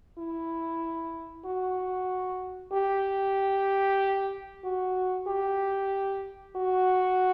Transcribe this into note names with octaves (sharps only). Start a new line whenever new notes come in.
E4
F#4
G4
F#4
G4
F#4